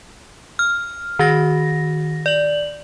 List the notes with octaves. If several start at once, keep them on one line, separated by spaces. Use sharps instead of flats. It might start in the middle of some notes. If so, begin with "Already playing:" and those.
F6
D#3 F#4 A#6
D5 F#7